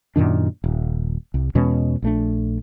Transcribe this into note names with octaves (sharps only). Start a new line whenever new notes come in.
F#2 A#2 D#3 D4
D#1
C2
E2 B2 G#3 C#4
A#1 A3 D4